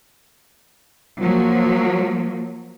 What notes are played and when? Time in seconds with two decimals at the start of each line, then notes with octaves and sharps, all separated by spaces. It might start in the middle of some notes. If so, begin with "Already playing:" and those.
1.19 F3 F#3 A#3